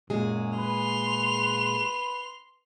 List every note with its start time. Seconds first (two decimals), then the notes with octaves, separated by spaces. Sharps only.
0.10 F#2 A#2 G#3 G#4
0.58 B4 C6 F7